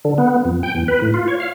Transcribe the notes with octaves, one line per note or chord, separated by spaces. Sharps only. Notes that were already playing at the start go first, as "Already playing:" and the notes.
D3
B3
F2
G5
E2
B4
A2
F4
C#5
F5